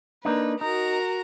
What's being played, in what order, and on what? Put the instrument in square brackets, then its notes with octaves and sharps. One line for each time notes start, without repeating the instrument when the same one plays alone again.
[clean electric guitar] A#3 D4 D#4 [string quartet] B4
[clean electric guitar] D#4 [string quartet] F#4 A#4 A#5